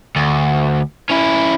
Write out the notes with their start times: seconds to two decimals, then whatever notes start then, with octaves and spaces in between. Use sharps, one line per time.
0.16 D2
1.10 C#4 E4